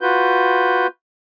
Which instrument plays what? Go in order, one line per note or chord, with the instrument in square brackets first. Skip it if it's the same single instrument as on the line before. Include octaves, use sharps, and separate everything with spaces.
[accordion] F4 F#4 B4 G6